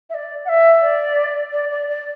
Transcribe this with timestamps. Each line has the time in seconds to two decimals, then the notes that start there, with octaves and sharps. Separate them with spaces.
0.09 E5
0.14 D5
0.44 F#5
0.48 E5
0.81 D5
1.52 D5
1.70 D5
1.89 D5